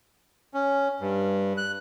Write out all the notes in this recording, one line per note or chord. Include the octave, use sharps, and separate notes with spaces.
C#4
G2
F#6